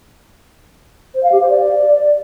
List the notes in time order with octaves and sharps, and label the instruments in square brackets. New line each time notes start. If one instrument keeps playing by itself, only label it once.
[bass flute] C5
F5
G4
C5
D5